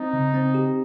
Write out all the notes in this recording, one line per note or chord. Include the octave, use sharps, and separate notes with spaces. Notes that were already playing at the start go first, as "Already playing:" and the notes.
Already playing: C4 D#4
C#3
C4
G4